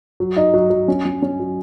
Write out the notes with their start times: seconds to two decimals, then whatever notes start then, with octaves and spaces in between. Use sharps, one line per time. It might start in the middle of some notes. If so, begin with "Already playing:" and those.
0.20 F#3
0.36 D#4
0.54 F#3
0.70 F#3
0.88 C#4
1.06 C#4
1.22 C#4
1.40 F#3